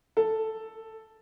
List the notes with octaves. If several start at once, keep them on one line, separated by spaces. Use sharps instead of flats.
A4